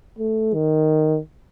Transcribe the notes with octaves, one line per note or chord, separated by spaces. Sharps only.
A3
D#3